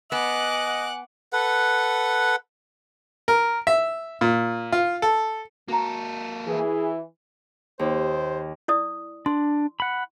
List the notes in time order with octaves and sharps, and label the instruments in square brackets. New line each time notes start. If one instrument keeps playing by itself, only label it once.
[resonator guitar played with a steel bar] B3 [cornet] D#5 [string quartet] F#5 D6 F#6 [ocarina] G#5
[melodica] A4 B4 F#5
[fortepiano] A#4
E5
A#2
F4
A4
[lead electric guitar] A#3 A4 [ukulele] F#4 A#5
[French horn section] E3 [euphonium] G#4
[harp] D#2 [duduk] C5
[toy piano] E4 D5 D#6
[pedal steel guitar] D4 [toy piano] C6
[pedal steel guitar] F#5 B5